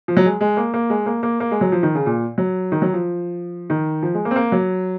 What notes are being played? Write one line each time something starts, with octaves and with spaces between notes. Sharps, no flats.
F3
F#3
G#3
G#3
A#3
A#3
G#3
A#3
A#3
A#3
G#3
F#3
F3
D#3
C#3
A#2
F#3
D#3
F#3
F3
D#3
F3
G#3
A#3
C4
A#3
F#3